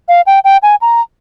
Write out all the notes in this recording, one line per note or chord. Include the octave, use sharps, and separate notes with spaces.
F5
G5
G5
G#5
A#5